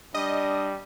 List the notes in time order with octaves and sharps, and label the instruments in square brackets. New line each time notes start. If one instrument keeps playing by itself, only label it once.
[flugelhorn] G3 [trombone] D4 [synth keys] D#5